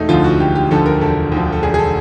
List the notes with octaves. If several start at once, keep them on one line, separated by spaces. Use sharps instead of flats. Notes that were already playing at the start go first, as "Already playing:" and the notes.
Already playing: E1 A3 D#4
D2 D3 F3 F4
F#4
E1 G4
G4
D2 D3 F3 A4
A#4
E1 A4
D2 D3 F3
A4
E1 G#4
G#4
A4